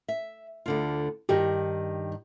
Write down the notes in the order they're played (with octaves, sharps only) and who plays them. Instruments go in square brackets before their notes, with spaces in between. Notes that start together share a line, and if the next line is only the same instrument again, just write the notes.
[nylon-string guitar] E5
D2 D3 F4
[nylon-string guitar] G2 D#3 [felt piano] G4